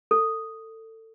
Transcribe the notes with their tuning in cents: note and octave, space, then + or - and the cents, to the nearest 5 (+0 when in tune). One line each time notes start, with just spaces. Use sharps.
A4 +25